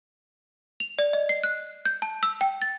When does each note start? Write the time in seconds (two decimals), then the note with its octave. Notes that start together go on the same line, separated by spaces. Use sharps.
0.80 F7
0.99 D5
1.13 D#5
1.29 C7
1.44 F#6
1.85 G6
2.02 A5
2.23 E6
2.41 G5
2.62 A6